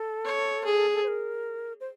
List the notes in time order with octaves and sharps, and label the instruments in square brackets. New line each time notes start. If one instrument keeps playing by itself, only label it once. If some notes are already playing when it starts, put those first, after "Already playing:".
Already playing: [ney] A4
[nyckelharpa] C#5
G#4
[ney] A4
C5
A#4
C5